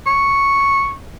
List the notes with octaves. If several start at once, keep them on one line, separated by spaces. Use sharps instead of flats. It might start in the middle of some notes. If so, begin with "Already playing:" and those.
C#6